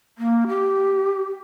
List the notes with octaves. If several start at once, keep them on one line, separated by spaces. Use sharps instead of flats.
A#3
G4